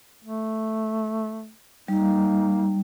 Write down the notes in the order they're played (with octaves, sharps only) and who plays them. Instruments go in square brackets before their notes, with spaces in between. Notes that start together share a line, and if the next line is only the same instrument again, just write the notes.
[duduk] A3
[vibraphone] G3 [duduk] A#3 [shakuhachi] D#4